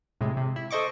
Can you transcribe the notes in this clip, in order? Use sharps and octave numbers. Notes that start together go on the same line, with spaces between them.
A2 C3 G#3
C3
E4
A4 C5 D#5 C#6 D6